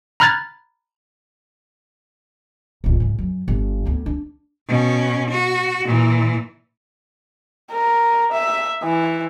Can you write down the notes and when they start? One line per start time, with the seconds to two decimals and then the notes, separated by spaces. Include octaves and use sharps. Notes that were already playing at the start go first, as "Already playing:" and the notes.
0.20 A#5 B5 F6 F#6 G#6 A6
2.84 D1 C#2
3.00 G#2 C#3
3.18 F#2
3.48 G1
3.85 D2 B3
4.06 D4
4.69 B2 C#4
5.31 F#4
5.86 A#2 E3
7.71 A#4
8.32 E5
8.83 E3